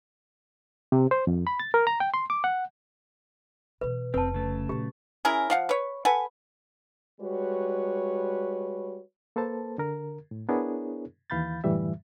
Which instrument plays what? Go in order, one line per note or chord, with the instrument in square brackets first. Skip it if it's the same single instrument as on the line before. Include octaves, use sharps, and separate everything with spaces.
[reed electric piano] C3
C5
F2
B5
A6
A#4
A#5
G5
C6
D6
F#5
[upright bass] B2 E3 [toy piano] B4
[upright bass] F1 [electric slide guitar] C4 [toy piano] B4 A5
[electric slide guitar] C#3 A3
[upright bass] A#2 F#3 [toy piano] G4
[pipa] C#4 E4 G#4 A#4
F3 F5 F#5
B4 C#5
A4 B4 F#5 G#5
[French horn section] G3 G#3 F#4 B4 C#5
[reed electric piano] A#3 A4 B4 C5 A5
D3 A#4
A2
B3 D4 E4 G#4 A#4 C#5
D#2 E3 F5 B5 G6 A6
F#2 A2 D3 E3 G3 E5